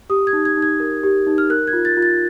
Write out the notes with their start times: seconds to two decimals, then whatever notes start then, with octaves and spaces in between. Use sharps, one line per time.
0.10 G4 D#6
0.27 G#6
0.33 D#4
0.45 G#6
0.57 D#4
0.62 G#6
0.80 A#4
1.03 G4
1.27 D#4
1.38 F6
1.50 A#4 F#6
1.67 G#6
1.73 F4
1.85 A6
1.97 F4
2.02 A6